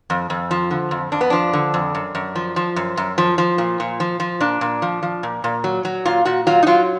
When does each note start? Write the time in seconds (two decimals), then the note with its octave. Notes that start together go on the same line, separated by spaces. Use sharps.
0.10 F2
0.30 F2
0.51 F3
0.71 D3
0.91 F2
1.12 F2 D4
1.21 B3
1.30 F3 D4
1.53 D3
1.74 F2
1.95 F#2
2.15 F#2
2.35 F3
2.56 F3
2.76 F#2
2.97 F#2
3.18 F3
3.38 F3
3.58 A#2
3.80 A#2
4.00 F3
4.20 F3
4.40 A#2 D4
4.61 A#2
4.82 F3
5.03 F3
5.23 A#2
5.44 A#2
5.64 F#3
5.85 F#3
6.05 A#2 F4
6.25 A#2 F#4
6.47 F#3 F4
6.63 D#4
6.67 F#3 F4